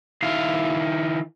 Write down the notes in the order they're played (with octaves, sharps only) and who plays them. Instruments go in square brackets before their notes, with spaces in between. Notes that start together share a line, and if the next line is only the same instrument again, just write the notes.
[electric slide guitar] D#3 E4 F5